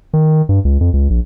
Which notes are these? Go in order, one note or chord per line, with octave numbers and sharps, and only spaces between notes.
D#3
G2
C#2
F2
C#2
A#1